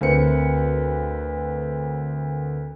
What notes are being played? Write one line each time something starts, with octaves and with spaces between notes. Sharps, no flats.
D2 C4 A#4 B4 C#7